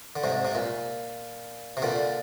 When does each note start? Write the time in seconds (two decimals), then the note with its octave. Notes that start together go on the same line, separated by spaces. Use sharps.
0.16 D3
0.24 G#2 C3
0.45 C3
0.55 A#2
1.77 C3
1.82 A#2 D3